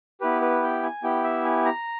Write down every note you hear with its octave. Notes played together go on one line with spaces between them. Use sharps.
B3 E4 G4 B4
B4
G5
G#5
B3 E4 G4 G5
E5
G#5
A#5